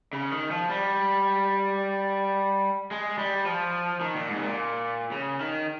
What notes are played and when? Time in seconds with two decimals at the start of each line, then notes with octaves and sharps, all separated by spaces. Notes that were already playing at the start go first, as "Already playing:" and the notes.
0.13 C#3
0.32 D#3
0.51 F3
0.69 G3
2.91 G#3
3.18 G3
3.45 F3
4.01 D#3
4.15 A#2
4.29 G#2
4.36 C3
4.42 A#2
5.12 C#3
5.40 D#3